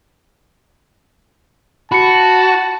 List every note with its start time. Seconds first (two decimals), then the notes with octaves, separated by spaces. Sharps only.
1.92 F#4 A5 B5 C#7